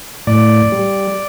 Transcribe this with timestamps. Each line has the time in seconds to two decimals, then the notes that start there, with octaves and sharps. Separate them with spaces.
0.27 A2 D5
0.72 G3